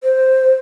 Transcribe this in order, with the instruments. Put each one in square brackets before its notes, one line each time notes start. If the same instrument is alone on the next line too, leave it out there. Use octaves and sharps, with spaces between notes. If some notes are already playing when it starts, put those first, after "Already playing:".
[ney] C5